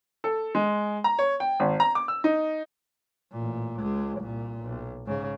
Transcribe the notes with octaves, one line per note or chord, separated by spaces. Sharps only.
A4
G#3
A#5
C#5
G5
G#1
A#5
D6
E6
D#4
A1 A#2
C#2 G#3
C2 A#2
B1
G#2 C#3